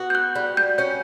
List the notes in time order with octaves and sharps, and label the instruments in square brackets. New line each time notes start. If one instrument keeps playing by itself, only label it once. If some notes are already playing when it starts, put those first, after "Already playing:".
Already playing: [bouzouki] B3 F#4
[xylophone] G6
F#6
[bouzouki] G3
[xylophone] G6
[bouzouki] C#4 [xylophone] G6